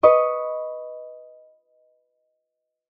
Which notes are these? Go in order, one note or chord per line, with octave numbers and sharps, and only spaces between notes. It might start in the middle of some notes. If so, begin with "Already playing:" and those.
B4 D#5 C#6